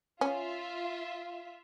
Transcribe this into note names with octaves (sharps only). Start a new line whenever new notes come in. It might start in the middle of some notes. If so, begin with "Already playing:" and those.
C#4 F4 E5